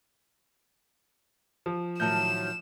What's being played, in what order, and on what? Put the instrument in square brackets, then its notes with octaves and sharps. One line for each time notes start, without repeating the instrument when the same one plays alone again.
[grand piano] F3
[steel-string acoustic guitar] A2 D#3 F#3 [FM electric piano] A5 F6 G6 [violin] E7